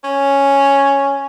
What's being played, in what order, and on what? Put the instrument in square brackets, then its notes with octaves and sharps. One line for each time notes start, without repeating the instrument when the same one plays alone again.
[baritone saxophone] C#4